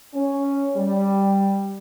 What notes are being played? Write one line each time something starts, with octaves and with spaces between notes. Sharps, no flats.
C#4
G3